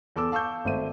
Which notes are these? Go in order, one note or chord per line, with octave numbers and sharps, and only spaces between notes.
E2 A4 D6 E6
F5 A5 C#6 E6 G6
G#1 A3 C5 E5 D#7